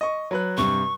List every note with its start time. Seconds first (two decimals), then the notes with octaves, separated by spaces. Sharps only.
0.01 D#5 C#6
0.31 F#3 B4 F#6
0.58 G2 C3 C#6